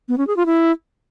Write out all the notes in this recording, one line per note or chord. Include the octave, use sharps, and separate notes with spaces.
B3
C#4
G#4
F4
E4